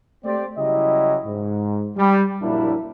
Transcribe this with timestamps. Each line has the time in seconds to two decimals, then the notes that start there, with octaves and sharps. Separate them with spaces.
0.25 A3 C4 G4 C5 D5
0.58 C#3 F#3 G3 E4 G4 D#5
1.25 G#2
1.97 G3
2.42 A#1 F#2 G3 A#3 D4 E4